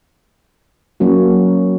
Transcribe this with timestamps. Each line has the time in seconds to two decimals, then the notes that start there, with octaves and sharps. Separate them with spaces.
1.00 F#3 A#3 C#4 F#4